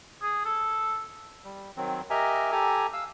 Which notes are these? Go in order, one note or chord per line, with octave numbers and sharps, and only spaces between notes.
G#4
A4
G3
D#3 F#3 C4
G4 A#4 D#5 E5 G#5 A#5
G4 A4 G#5 A#5
F5 E6